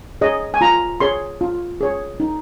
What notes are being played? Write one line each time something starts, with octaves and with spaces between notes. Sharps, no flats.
G#4 C#5 D#5
G#5
F4 A#5
G#4 C#5 C6
F4
G#4 C#5
D#4